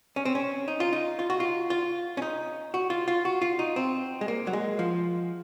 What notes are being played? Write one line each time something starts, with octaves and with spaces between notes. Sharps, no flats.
C#4
C4
C#4
D#4
F4
D#4
F4
F#4
F4
F4
C#4
D#4
F#4
F4
F4
F#4
F4
D#4
C4
G#3
A#3
F#3
G#3
F3